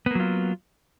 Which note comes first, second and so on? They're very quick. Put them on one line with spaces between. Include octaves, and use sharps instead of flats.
B3 A#3 F#3 F4